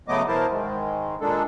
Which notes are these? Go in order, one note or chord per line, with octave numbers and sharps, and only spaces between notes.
C#3 F#3 A3 B3 D#5 D6
B2 E3 E4 A#4 C5 A5
G#2 D#3 G#3
A#2 G#3 A#3 D4 A4